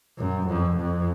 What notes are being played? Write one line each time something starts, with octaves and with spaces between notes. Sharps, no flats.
F#2
F2
F2